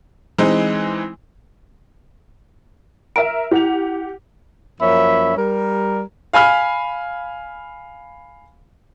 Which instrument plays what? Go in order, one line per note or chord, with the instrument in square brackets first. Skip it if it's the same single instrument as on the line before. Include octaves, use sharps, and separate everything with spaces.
[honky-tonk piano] E3 G#3 C4 D#4
[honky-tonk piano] A#4 E5 F6 [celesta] D7
[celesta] E4 [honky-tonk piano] G4 F#5 F7
[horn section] F#2 F3 A#3 C#4 E5 B5
G3 A#4
[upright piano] F5 G#5 B5 F6